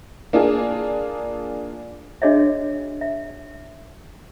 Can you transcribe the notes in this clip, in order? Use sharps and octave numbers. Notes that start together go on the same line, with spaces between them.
A#3 D4 F4 G#4
D4 F#4 G#4 C#5 D#5 E5
E5